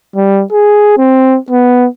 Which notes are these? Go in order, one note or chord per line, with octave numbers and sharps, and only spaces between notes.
G3
G#4
C4
B3